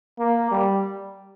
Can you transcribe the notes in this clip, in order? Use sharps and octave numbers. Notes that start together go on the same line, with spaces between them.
A#3
G3